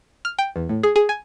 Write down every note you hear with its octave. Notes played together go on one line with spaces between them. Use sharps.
F6
G5
E2
A2
G#4
G#4
G#5